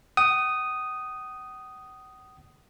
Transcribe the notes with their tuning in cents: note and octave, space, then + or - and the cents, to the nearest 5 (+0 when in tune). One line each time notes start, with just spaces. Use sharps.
F#5 +45 D#6 +0